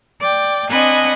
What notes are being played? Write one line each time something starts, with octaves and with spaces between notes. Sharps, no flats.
D5 G5
C4 D4 D#5 F#5 G#5 B5